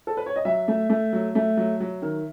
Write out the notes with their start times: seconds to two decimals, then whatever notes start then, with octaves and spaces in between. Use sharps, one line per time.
0.07 A4
0.17 B4
0.26 C#5
0.36 D#5
0.45 F#3 E5
0.68 A3
0.90 A3
1.13 F#3
1.35 A3
1.57 F#3
1.80 F#3
2.02 D#3